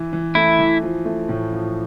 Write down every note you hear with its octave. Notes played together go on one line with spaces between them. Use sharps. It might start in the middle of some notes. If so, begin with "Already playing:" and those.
Already playing: E3
E3
A3 E4
E3
F3
A3
A2
F3